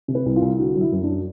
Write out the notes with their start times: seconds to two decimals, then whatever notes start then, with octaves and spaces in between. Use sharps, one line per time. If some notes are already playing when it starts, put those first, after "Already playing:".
0.08 C3
0.15 B4
0.26 C2
0.36 F4
0.42 C2
0.58 D3 F#4
0.76 F#3
0.81 E4
0.92 F#2
1.03 D4
1.09 F#3